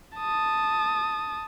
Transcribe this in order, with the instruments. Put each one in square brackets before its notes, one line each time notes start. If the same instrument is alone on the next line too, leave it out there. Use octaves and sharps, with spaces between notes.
[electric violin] A5 D#6